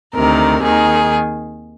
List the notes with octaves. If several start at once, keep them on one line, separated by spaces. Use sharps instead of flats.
D2 C3 D#3 A#4
D#2 D#3 G#4